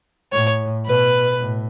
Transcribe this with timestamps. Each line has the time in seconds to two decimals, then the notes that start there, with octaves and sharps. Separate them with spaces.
0.32 A2 C#5
0.86 B2 B4
1.39 A2